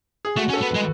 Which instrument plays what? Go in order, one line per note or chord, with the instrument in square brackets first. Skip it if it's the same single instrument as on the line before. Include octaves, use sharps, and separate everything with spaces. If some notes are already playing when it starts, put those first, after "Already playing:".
[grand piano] G#4
[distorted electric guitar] A3 [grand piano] F#4
[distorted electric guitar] C#4
[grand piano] A4
[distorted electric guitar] B3
[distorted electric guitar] G#3 [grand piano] B4